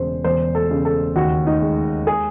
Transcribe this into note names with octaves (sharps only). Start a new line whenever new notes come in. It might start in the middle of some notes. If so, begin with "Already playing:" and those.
Already playing: E1 C#3 C5
E1 C5
A4
C#3
A4
D#2 F#4
D#4
G#3
G#4